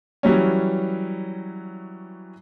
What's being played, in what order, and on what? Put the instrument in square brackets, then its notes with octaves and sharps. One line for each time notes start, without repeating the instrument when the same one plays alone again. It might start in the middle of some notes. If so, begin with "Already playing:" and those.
[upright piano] E3 F#3 G3 C#4